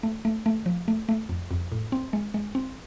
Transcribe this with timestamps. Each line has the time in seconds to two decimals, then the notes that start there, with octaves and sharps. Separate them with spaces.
0.03 A3
0.25 A3
0.46 A3
0.66 F3
0.88 A3
1.09 A3
1.29 F2
1.51 F2
1.72 A2
1.92 C4
2.13 G#3
2.34 G#3
2.55 C4